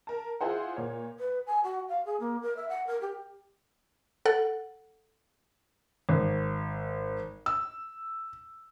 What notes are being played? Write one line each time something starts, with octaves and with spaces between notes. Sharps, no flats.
A#4 A5
E4 F4 G#4 C5 F#5
A#2 C#5
B4
G#5
F#4
F5
G#4
A#3
A#4
E5
F#5
A#4
G4
A4 F#5
G#1
E6